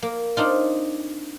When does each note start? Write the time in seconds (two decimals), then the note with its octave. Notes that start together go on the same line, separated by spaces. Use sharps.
0.02 A#3
0.37 C4 D4 D#4 F4